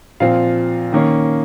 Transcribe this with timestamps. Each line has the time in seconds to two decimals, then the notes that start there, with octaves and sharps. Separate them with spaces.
0.20 A#2 F3 C4 F5
0.92 D#3 A#3 C#4